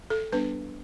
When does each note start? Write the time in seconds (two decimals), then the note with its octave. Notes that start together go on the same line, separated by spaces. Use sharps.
0.10 A4
0.32 G3 B3 D4 B4